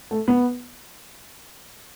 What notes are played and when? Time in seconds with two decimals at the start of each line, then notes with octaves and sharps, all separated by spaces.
0.11 A3
0.28 B3